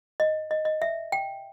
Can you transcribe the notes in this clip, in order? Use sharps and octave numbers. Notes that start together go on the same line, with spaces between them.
D#5
D#5
D#5
E5
G5